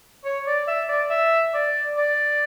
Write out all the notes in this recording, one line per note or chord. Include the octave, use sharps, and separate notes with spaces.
C#5
D5
E5
D5
E5
D5
D5